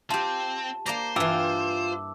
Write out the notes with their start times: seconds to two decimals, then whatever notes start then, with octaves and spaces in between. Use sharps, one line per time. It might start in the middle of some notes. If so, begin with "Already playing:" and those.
0.10 C4 F4 G4 A5
0.86 A#3 C5 D5 A#5
1.16 G2 E3 F4 F5 G5 D6 E6